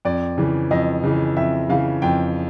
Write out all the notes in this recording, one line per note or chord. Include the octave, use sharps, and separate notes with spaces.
F2 D5
C#3 E3
F2 D#5
C#3 E3
F2 E5
C#3 E3 F5
F2 G5